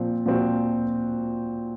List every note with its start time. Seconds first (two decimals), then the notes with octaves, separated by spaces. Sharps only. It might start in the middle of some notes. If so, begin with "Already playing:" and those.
Already playing: A#2 F3 C4
0.26 A#2 F3 C4 F#4